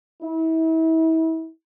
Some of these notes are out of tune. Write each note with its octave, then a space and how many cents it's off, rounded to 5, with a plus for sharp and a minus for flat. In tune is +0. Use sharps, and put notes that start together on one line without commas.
E4 -35